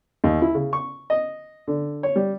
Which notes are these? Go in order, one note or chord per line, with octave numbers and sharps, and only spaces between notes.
D#2
E4
C#3
C#6
D#5
D3
C#5
G3